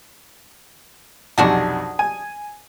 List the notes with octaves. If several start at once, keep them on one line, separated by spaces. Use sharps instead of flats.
B1 F2 C3 D4 F#4 G#4
G#5